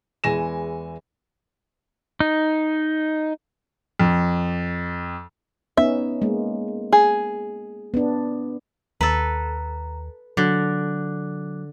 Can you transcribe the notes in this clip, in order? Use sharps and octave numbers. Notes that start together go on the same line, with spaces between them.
E2 E3 G#3 G#5 A#6 E7
D#4
F2
B3 C#4 D#4 E5
G#3 A#3
G#4
B3 D4
D#2 A4 B4 A#5
D3 F#3 D6 F#6